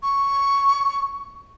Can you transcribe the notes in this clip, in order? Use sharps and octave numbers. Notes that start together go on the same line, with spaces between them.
C#6